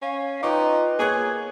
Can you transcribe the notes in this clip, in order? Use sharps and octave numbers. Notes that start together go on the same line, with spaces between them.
C#4 F5
D#4 F4 B4 G5 C#6 D6
A#3 G#4 C#5 G#5 F#6